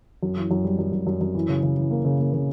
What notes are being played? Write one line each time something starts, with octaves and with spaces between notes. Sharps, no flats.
F#2
E3
F#2
G3
F#2
F#2
F#2
F#2
E3
C#3
C#3
E3
A#3
C#3
A#3
C#3